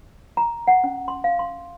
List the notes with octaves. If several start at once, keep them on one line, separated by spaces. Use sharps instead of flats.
A#5
F#5
C#4
C6
F5
C6